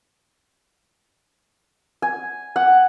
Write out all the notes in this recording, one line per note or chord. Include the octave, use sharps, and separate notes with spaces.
G#5
F#5